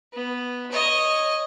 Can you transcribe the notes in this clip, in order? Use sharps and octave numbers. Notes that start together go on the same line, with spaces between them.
B3
C#5 D#5